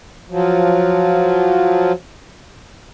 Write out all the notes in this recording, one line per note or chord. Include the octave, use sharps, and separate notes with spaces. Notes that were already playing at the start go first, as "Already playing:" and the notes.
F3 F#3